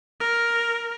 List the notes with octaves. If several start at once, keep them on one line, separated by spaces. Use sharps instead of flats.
A#4